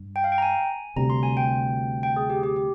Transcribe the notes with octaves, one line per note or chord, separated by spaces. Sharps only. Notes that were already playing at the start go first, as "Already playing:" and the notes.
Already playing: G2
G5
F5
G5
A#5
G#5
D2 C3 G3 A#5
C6
G#5
G5
G5
G#4
G4
G4
G4